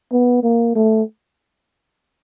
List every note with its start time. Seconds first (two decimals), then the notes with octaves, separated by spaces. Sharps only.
0.12 B3
0.43 A#3
0.75 A3